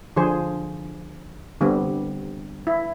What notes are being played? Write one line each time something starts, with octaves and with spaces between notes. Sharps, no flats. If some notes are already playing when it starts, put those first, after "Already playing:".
D3 F3 G#4 C5
D3 G3 B3 C4
E4